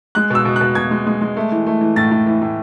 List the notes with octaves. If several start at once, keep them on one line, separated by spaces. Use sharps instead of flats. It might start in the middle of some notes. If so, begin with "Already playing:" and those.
G#3 F#6
B2 E6
B2
B2 F#6
B2 G#6
G#3
G#3
G#3
A3
E3
A3
E3
A2 A6
A2
E3
A2